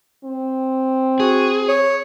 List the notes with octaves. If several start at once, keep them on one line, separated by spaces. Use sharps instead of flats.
C4
F#4 G#4
C#5